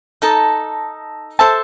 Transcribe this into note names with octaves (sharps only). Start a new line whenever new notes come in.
D#4 A4 D#5 A5
A4 C5 E5 A5